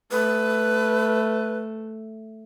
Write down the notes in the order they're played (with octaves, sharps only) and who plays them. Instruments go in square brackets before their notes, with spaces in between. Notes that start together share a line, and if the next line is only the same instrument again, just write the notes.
[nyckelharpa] A3 [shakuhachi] B4